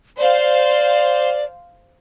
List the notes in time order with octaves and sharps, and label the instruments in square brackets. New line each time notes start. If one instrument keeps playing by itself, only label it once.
[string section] C5 F5 [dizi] D5